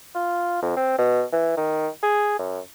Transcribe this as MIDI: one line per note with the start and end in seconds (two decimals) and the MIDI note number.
0.15 0.60 65
0.62 0.73 41
0.76 0.96 60
0.98 1.22 47
1.32 1.56 52
1.57 1.88 51
2.03 2.34 68
2.39 2.59 42